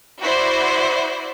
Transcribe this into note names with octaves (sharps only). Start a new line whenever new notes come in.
E4 F#4 C5 D5